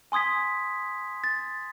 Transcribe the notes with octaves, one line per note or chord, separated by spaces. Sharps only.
G#5 C6 D#6 G#6 B6
A6